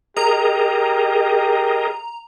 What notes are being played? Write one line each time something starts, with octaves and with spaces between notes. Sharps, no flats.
G4 G#4 A#4 D#5 A#5